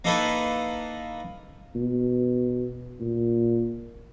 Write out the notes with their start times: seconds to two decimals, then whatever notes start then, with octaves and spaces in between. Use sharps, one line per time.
0.05 A#3 D#4 E4 A4 B4
1.75 B2
3.00 A#2